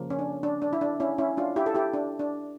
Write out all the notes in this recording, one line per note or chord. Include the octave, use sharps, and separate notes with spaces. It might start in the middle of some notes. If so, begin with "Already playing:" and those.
Already playing: C#3 F3 A#3
C#4
D4
D4
D4
E4
D4
C#4 E4
C#4 E4
D4 F4
E4 G4
A4
E4 G4
D4
D4